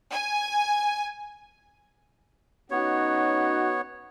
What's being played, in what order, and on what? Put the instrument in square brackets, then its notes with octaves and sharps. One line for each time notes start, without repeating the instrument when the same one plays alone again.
[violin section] G#5
[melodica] B3 C#5 [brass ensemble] C#4 D#4 F#4